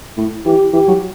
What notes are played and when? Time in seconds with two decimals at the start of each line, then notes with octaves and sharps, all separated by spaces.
0.17 A2
0.45 E3 G4
0.73 E3 G4
0.88 F#3